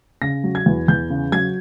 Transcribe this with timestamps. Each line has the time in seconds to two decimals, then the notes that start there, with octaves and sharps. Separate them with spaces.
0.21 C#3 A#6
0.44 F#3
0.55 G#6
0.66 E2
0.88 E2 G6
1.10 C#3
1.32 F#3 G#6